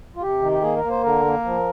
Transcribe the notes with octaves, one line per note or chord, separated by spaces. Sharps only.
F4
C3 G4
D#3
G4
A#3 G#4
A#4
A#3
C5
D3 A#4
A#3
F3